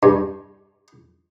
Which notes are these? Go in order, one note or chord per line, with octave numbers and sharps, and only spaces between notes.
G2